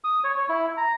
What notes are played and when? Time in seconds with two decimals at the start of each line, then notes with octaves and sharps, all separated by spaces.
0.04 D#6
0.24 C#5
0.38 C#5
0.49 E4
0.77 A#5